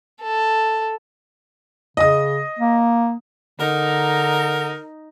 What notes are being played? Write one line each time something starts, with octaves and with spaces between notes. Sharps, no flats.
A4
C#3 D#5 D#6
A#3
D3 D#4 A#4